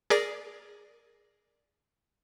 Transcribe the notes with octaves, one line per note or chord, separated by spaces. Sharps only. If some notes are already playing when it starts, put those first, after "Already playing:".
G#4 A#4 D5 A#6